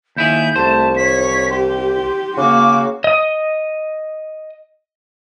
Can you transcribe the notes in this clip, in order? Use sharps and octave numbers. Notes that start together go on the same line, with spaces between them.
D#2 E4 G#4 G6
C2 A3 C5 A5
C#5 B6
G4 C6
C#3 A#3 F#4 D6
D#5 D#6